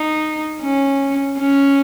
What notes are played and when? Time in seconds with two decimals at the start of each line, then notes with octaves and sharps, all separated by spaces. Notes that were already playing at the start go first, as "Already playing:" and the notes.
Already playing: D#4
0.61 C#4
1.39 C#4